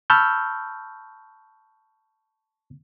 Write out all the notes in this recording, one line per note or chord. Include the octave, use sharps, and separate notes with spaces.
A5 B5 C#6 E6 F6 G6